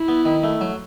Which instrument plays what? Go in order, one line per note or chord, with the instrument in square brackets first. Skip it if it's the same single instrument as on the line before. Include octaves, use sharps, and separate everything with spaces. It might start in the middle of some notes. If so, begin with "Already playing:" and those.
Already playing: [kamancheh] E4
[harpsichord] B3
D#3
A3
F#3